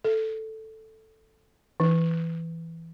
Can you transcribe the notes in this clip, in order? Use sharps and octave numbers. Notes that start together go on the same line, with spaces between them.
A4
E3